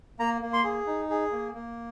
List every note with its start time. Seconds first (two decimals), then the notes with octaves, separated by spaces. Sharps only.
0.19 A#3 A#5
0.42 A#3
0.53 C6
0.64 G#4
0.87 D#4
1.10 G#4
1.32 A#3
1.54 A#3